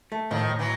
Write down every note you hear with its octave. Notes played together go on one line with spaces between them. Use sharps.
A3
A2 D#3 F3
A2
E3 F#3